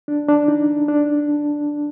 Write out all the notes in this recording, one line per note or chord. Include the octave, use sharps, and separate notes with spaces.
D4
D4
D#4
D4